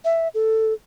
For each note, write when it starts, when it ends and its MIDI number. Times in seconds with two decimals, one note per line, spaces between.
0.05 0.28 76
0.34 0.73 69